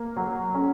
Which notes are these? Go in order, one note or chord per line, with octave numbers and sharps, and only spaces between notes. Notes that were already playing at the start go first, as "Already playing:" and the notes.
Already playing: A#3
F#3
C#4